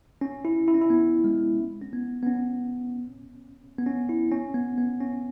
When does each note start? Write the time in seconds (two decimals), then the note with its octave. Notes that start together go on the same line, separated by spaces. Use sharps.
0.21 C#4
0.45 E4
0.68 E4
0.74 C#4
0.81 E4
0.90 B3
1.24 G#3
1.81 C#4
1.93 B3
2.23 B3
2.27 C#4
3.78 B3
3.86 C#4
4.09 E4
4.32 C#4
4.54 B3
4.78 B3
5.00 C#4